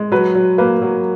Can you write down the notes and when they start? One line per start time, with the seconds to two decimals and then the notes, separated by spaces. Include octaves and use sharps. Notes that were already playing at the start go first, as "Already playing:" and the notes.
Already playing: G#3
0.12 F#3 B4
0.35 F#3
0.58 A#3 B4
0.82 F#3